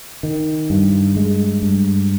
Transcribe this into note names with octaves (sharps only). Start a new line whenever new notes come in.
D#3
G2
G#3
G2